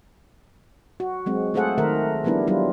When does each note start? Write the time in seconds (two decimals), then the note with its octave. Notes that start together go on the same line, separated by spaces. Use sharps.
1.00 F#4
1.26 F#3 G#3 C4
1.54 A3 F4 G#4 A4 C5 F#5
1.78 D#3 A3 A#4 E5
2.24 F3 G3 B3 D4 E4
2.47 F#3 G3 D4 E4 F4